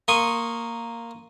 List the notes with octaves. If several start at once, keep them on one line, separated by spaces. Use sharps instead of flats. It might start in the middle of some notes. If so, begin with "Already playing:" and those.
A#3 C6 C#6 D#6